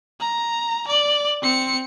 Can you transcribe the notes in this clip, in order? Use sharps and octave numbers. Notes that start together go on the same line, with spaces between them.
A#5
D5
C4 C#7